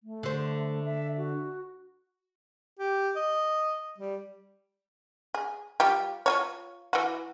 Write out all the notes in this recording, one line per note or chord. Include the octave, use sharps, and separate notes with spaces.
A3
D3 C5
E5
F#4
G4
D#5
G3
G#4
G3 F4 G4
F4 F#4 C#5
E3 F#4